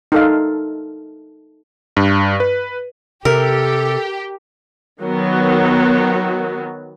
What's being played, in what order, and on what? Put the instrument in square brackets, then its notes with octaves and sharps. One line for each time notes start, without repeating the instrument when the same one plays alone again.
[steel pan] D#4 A4 F5
[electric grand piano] G2
B4
[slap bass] C3 [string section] G4 [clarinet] A4 [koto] A#4
[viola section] D#3 F#3 B3 F#4